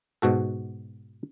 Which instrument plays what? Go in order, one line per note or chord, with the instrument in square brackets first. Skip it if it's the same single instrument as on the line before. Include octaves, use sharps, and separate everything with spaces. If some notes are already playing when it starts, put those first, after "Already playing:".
[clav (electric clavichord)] G#2 B2 F#4 A4